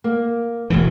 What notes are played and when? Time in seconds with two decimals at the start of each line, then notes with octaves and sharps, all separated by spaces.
0.04 A#3
0.70 E1 G#2 E3 A3